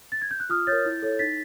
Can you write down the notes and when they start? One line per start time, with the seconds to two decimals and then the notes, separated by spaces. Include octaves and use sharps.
0.12 A6
0.22 G#6
0.31 G6
0.40 F#6
0.49 F4 D#6 F6
0.67 A#4 C#5 G6 A6
0.85 E4
1.02 A4 C#5
1.19 D#4 A6 B6